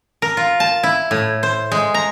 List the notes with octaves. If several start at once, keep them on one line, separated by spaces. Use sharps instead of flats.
A#4
F4
A5
E4
A2
C5
G#3
A#5